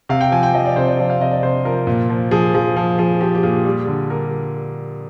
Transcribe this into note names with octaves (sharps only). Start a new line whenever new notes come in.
C3 F5
G5
F3 G#5
G5
F3 D#5
D5
C3 C5
D5
F3 D5
F5
C3 D#5
D5
C3 C5
F3 A#4
A#2
F3
F3 G#4
F3 G#4
F3
F3 G#4
F3 G4
G4
A#2 G#4
G3
D3
G3 A#4